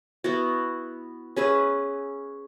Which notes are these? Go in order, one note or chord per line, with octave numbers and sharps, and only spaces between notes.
B3 E4 F#4
C#4 G#4 B4 E5